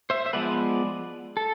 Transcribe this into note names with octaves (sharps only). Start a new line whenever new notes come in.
C5 E5
E5
F3 G#3 B3 B4 D5
A4